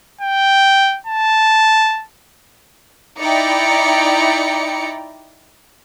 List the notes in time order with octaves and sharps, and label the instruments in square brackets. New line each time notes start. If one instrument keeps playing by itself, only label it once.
[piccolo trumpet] G5
A5
[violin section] D#4 E4 D5 G5 A#5 C#7